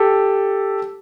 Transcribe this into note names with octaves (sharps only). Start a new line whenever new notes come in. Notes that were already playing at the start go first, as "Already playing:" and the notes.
Already playing: G4 A4